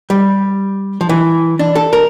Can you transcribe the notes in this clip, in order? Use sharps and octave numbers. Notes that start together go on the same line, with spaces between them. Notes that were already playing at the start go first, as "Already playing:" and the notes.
G3
F3
E3
D4
A4
A#4